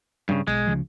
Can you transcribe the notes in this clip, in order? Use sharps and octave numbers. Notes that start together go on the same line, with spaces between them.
G2 C#3
B1 G#3
C#2 C#3 F3